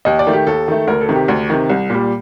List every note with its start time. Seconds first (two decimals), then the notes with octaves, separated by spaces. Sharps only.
0.05 D#2 D#5
0.19 D5
0.27 D#3 A3
0.33 G4
0.47 D#2 A4
0.68 D#3 A3
0.87 D2 A#4
1.01 A4
1.09 C3 D#3
1.16 G4
1.28 D2
1.50 C3 D#3
1.70 C2
1.90 A#2 G3